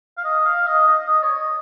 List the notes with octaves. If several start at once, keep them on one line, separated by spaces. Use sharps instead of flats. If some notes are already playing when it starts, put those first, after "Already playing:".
F5
D#5
F5
D#5
D#5
D#5
C#5
D#5